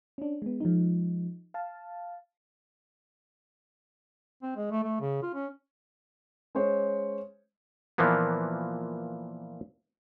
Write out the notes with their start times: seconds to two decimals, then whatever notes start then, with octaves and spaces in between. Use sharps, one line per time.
0.18 C#4 D4
0.42 G#3 B3
0.60 F3 G#3 D#4
1.54 F5 A5
4.43 C4
4.56 G#3
4.71 A3
4.84 A3
5.01 C#3
5.23 F4
5.34 C#4
6.55 G#3 C#4 C5 C#5
7.98 A#2 E3 F3 A#3 B3